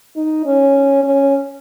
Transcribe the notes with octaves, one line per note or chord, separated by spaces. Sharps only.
D#4
C#4
C#4